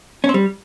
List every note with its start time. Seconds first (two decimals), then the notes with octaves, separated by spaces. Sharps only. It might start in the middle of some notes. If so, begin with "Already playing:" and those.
0.24 C#4
0.29 C4
0.34 G3